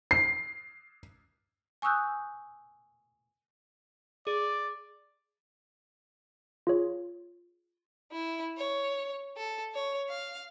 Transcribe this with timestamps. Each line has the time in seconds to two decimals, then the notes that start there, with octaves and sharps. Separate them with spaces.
0.11 C7
1.82 G#5 C#6 D#6 E6 F#6 G6
4.27 G#4 D5
6.67 F4 G#4 C#5
8.12 E4
8.58 C#5
9.37 A4
9.75 C#5
10.10 F5